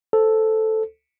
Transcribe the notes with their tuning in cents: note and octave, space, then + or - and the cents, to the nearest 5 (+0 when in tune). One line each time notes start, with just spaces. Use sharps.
A4 +0 C5 +0